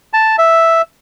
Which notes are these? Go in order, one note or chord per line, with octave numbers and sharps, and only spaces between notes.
A5
E5